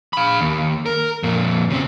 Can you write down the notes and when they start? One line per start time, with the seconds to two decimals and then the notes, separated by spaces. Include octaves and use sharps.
0.13 F5 B5
0.41 D#2
0.86 A#4
1.23 F2 A#2
1.70 C#3 C4